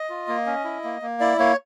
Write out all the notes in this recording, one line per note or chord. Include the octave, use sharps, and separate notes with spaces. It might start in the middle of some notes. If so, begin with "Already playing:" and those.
Already playing: D#5
F4
A#3
C#4
E4
A#3
A#3
E4 D5
A#3 C#5